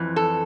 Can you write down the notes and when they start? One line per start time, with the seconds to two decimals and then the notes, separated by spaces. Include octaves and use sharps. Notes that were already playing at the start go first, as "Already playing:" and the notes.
Already playing: F2 E3
0.16 A4